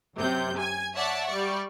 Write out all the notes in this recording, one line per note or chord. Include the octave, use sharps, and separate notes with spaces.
F#2 C3 G6
G#5 G#6
C#5 D5 E5 F#5 A5
G3 D5 C#6